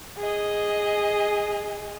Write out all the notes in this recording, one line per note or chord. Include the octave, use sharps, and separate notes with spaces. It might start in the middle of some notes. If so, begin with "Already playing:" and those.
G#4 D#5